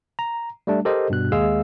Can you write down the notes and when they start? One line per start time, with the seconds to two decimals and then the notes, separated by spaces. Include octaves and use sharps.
0.19 A#5
0.67 G3 A3 D4
0.85 G4 A4 A#4 C5 D#5
1.10 G2 B2 F#6
1.32 D#2 G#3 G#4 F5 E6